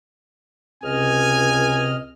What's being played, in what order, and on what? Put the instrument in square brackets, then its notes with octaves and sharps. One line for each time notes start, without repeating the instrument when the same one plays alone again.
[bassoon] C#2 [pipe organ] C3 D#5 F6 [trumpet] G#5